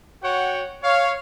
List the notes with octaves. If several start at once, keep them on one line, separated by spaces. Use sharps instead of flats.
F#4 C#5 F#5 G5
C#5 F5